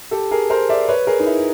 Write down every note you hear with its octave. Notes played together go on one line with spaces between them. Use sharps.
G4 A4
G#4 A#4
A#4 C5
D5 E5
B4 C#5
G#4 A#4
D#4
E4